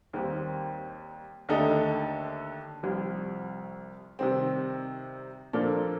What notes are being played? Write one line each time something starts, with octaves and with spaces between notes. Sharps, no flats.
D#2 D#3 G3 C4 G4
D#2 D3 A3 D#4 A4
C2 C3 F3
C3 D#3 G3 C4
A#2 F3 A#3 D4 A4